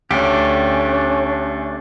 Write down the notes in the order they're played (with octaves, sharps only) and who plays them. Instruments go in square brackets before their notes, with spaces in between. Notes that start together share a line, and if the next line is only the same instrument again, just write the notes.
[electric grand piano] D2 [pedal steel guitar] A3 D4 G4 [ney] C#4